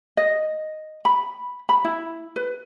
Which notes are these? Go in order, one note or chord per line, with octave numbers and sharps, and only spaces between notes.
D#5
B5
B5
E4
B4